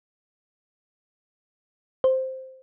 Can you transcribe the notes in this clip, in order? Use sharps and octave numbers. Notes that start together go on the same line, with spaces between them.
C5